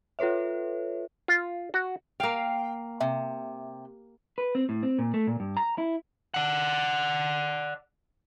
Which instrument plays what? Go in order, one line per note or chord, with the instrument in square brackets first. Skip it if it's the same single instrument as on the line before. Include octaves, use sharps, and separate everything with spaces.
[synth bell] F4 A4 B4 C#5 E5
[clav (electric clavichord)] F4
F#4
[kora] A#3 F5 [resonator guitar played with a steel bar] G5
[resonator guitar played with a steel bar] C3 [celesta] E5
[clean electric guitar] B4
C4
A2
C4
A#2
A3
A#2
G2
A#5
E4
[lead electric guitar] D5 F#5